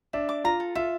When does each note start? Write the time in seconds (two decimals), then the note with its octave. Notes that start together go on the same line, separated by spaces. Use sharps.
0.13 D4 E5
0.29 D6
0.44 F4 A#5
0.60 A4
0.75 F4 E5